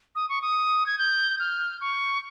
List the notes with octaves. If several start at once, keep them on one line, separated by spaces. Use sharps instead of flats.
D#6
C#6
D#6
G#6
G6
F6
C#6